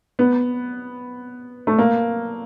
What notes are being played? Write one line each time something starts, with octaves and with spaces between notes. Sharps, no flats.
B3
A3
A#3